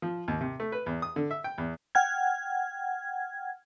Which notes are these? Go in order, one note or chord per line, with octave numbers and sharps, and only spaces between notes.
F3
D#2
C3
A3
B4
E2
D#6
D3
E5
G5
E2
F#5 G5 F6 G#6